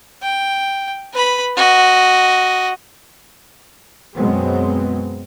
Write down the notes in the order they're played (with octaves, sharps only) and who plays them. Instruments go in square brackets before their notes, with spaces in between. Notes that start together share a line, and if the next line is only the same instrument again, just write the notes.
[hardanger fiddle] G5
B4 B5
F#4 D#5
[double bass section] F#2 B2 F#3 G#3 B3 C4